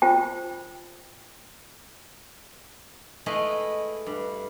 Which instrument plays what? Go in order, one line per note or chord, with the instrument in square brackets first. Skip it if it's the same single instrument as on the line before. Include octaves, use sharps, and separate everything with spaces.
[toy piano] F4 C5 G5
[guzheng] G#3 A3 E4 B4 D#5 F5
G2